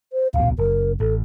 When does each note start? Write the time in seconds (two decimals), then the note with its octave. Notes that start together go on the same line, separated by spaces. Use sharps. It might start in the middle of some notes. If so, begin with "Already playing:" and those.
0.13 C5
0.34 D1 A#1 B2 F5
0.59 F#1 A#4
1.00 A1 A4